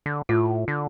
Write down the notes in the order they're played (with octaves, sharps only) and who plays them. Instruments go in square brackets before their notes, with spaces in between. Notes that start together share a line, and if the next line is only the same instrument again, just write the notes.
[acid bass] D3
[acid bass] A2 [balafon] F4
[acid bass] D3